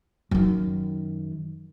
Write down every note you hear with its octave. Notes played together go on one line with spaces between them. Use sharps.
F#2 D#3